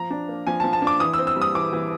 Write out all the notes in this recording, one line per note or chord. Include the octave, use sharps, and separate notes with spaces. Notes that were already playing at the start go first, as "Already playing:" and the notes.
Already playing: F3 A#5
D4
A#3
F3 G#5
F3 A5
A5
D4
D6
E3 D#6
E6
C4
E6
G3
D#6
E3 D6
E3